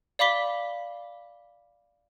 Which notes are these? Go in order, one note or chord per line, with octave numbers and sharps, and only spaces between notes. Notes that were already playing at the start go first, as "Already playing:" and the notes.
D5 F5 B5 D6 B6 G7